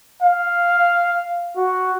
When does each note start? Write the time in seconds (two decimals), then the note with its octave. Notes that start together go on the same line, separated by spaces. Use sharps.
0.22 F5
1.57 F#4